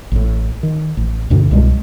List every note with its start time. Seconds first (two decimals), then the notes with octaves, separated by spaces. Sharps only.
0.12 A1 A2
0.63 D#3
0.97 A1
1.30 D2 G2 B2 D3
1.51 C2 B2 G3 G#3